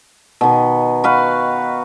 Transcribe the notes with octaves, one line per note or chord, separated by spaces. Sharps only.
B2 D#3
F#4 B4 F5